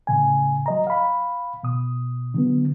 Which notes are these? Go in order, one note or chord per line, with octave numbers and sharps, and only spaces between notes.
A2 C#3 G#5
F#3 D#5 A#5
F5 B5
B2 D#6
D3 F#3 B3